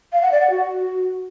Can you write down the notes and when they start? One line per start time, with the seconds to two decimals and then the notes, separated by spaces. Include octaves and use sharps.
0.12 F5
0.21 F#5
0.31 D5
0.40 F#5
0.50 F#4